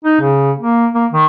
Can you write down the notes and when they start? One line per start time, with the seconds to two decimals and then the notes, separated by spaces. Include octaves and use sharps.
0.05 D#4
0.21 C#3
0.59 A#3
0.94 A#3
1.12 D#3